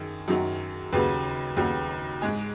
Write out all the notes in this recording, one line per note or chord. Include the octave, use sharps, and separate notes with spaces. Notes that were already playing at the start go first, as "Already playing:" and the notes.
Already playing: F#2 D#3 G#4
F#2 D#3 F#3
D#2 C#3 F#3 B4
D#2 C#3 F#3
G#2 G#3 G#4